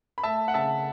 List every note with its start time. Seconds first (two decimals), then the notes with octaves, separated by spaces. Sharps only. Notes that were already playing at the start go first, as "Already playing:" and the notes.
0.18 B5
0.23 A3 E5 A5
0.48 F#5
0.54 C#3 E5 A5